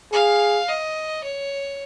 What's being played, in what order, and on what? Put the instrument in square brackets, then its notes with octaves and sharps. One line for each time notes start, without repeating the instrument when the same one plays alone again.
[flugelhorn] G#4 [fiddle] F5
[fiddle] D#5
C#5